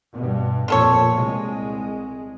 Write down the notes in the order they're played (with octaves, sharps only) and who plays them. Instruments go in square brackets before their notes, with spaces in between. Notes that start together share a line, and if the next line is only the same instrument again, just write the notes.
[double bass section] G2 B2
[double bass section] F2 A#2 [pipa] F4 A4 C#5
[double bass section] C2 G#3